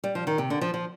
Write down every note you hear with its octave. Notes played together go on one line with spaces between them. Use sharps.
G3
F3
D#3
C3
D3
F3
F3